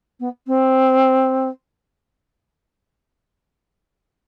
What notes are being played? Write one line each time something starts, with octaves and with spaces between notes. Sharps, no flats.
B3
C4